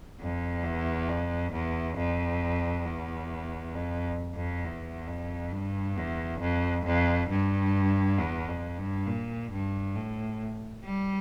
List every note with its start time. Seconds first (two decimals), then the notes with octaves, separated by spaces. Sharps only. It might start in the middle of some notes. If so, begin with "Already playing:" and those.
0.20 F2
0.64 E2
1.09 F2
1.53 E2
1.97 F2
2.86 E2
3.74 F2
4.35 F2
4.64 E2
5.08 F2
5.52 G2
5.97 E2
6.40 F2
6.85 F2
7.30 G2
8.19 E2
8.48 F2
8.78 G2
9.06 A#2
9.52 G2
9.95 A2
10.85 G3